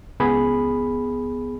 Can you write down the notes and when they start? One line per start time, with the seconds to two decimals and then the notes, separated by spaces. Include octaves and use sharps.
0.20 C#2 B3 G#4 B5